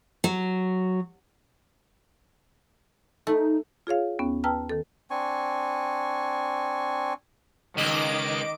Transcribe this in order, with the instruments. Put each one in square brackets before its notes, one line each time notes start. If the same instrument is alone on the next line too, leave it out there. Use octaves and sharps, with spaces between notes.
[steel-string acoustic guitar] F#3
[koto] A3 [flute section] D#4
[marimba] F4 G#4 C#5 F5
D#2 B3 C#4
B4 G5 A5 A#5 E6 F6
D#3 A4
[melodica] C4 D4 G#5 C#6
[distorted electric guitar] C#2 [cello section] D#3 [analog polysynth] D#5 D6 D7